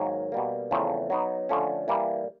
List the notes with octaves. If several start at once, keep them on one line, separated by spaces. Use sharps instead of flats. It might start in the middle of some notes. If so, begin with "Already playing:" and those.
Already playing: G#2 D#3 F#3 A#3
B2 G3 A#3
E2 C#3 F3 A3 C4
F#3 B3 D#4
D3 F3 A3 C#4
E3 G3 A#3